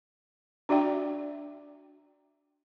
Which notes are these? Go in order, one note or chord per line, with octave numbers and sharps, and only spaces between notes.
D4 F#4 D5 E5 G5